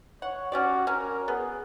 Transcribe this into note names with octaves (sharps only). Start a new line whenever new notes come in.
C#5 F#5
C#4 F#4 G4 D5
C#4 A#4
B3 G#4